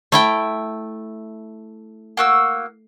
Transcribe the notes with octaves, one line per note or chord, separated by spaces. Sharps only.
A3 E4 G5
A#3 F#4 E6